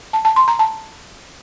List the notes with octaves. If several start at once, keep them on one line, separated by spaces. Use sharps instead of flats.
A5
A5
C6
A#5
A5